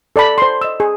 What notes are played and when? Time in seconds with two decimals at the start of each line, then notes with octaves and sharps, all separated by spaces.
0.16 A4 D5 A5 B5
0.38 C5 C6
0.61 D#5 E6
0.80 G#4